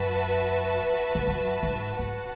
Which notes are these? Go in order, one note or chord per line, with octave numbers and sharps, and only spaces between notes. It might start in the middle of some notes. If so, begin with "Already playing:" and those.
Already playing: F#2 F#4 B4 E5 A5
G#2
F#2
G#2
G#2 F#4 B4 F#5 A5